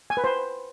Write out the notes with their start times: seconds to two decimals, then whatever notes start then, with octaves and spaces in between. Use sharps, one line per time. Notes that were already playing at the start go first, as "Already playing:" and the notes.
0.10 G#5
0.17 B4
0.24 C5